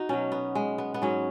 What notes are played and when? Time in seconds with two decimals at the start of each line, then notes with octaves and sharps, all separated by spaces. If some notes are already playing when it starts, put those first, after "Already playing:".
Already playing: D#4 F#4
0.09 B2 F#3 C#4
0.32 B3
0.55 G#3
0.78 B3
0.94 B3
1.02 G#2 F#3 C#4